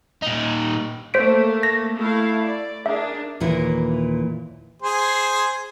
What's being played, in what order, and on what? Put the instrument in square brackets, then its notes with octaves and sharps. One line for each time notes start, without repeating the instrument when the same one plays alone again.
[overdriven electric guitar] A#2 D#4
[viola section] A3 A#3 [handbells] C5 B6 D7
[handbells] A#6
[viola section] A3 E4 F5
D5
[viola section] D4 G#4 A#4 [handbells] E5
[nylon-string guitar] D#2 A#2 E3 E4 A#4
[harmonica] G#4 C5